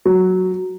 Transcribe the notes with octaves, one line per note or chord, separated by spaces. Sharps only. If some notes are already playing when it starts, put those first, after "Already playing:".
F#3